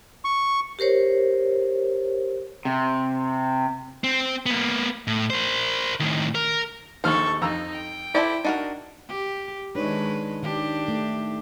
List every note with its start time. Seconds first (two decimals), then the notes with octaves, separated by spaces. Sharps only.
0.25 C#6
0.79 G4 A#4 C5 C#5
2.65 C3
4.04 C4
4.46 A#3 B3
5.07 A2
5.30 A#4 C5
6.00 A2 D#3
6.35 A#4
7.04 A#1 D#2 A4 C5 C#6 F6
7.41 F2 D#4 A#5 E6
7.73 G5
8.15 E4 A4 C5 D5
8.45 D4 D#4 F#4 A#4
9.09 G4
9.75 D#3 G#3 D4 D#4 B4 C#5
10.43 D#3 D4 G4
10.88 A3